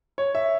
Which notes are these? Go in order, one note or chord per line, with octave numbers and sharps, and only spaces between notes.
C#5
E5